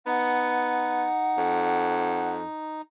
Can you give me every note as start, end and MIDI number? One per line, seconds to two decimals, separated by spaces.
0.06 1.06 59
0.06 2.81 63
0.06 2.31 78
1.38 2.43 41